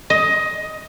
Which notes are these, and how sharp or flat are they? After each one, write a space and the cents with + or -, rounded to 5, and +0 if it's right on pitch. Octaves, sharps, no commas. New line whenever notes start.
D#5 +15